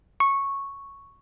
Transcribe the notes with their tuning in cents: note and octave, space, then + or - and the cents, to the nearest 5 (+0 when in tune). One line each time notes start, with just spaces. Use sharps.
C#6 -5